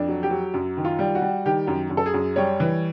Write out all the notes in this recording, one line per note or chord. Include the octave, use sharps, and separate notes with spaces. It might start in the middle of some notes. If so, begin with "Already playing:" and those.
Already playing: F2 D4
F#3
G4
F#3
F#2
D#3
F4
G3
F#4
G3
D#3 G4
F#2
F#2
A4
G#4
F#2
G3 C#5
E3